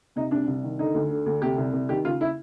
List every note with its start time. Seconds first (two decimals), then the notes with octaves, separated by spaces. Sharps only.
0.16 C3 D#4
0.31 C2 D4
0.48 C2
0.64 D#3
0.79 D3 D#4
0.94 D2
1.10 D3
1.26 D2
1.42 C3 G4
1.58 C2
1.73 C2
1.89 D#3 G4
2.05 C#3 F4
2.21 E4